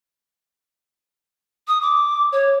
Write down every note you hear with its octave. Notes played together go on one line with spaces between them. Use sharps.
D#6
D6
C#5